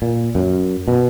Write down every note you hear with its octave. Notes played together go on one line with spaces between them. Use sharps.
A#2
F#2
B2